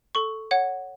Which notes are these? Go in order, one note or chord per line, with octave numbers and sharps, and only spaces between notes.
A4 C#6
C#5 F#5